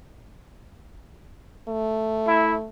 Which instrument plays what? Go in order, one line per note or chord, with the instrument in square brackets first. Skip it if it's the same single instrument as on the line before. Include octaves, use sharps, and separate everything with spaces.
[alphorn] A3
[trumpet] E4